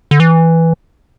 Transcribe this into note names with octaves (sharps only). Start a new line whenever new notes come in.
D3
E3